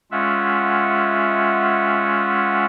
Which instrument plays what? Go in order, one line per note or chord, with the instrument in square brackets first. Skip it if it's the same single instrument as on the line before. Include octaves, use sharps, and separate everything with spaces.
[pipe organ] G#3 C#4 F4 E5 F#5